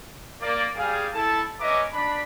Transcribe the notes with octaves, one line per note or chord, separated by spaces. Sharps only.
A#3 D5
G3 G#4 F5
E4 A4 A5
B3 C#4 D#5 E5 A#5 D6
D4 B5